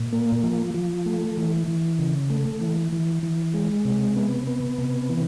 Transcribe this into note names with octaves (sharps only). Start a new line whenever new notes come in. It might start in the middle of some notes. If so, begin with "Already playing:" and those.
Already playing: A#2
A#3
F3
F3
A3
E3
E3
C#3
A3
E3
E3
E3
G#3
C3
B3
B3
C3
E3